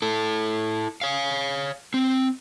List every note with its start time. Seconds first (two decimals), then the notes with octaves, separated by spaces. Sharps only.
0.02 E4 A4
1.01 C#5 F5
1.94 C4